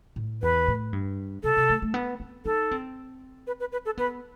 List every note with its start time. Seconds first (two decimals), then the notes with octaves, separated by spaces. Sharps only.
0.16 A2
0.42 E2 B4
0.68 A2
0.93 G2
1.43 C3 A4
1.57 C3
1.69 A3
1.82 A3
1.94 B3
2.20 C4
2.45 D#4 A4
2.71 C4
3.47 B4
3.60 B4
3.72 B4
3.85 A4
3.97 B3 B4